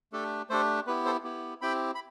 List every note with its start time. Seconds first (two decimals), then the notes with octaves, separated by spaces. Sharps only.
0.12 A3 D4 G4 A4
0.50 A3 D4 G4 A4 C5
0.87 B3 E4 G4 B4
1.05 A4 C5
1.24 B3 E4 G4
1.61 C4 E4 G4 G5 B5
1.95 B5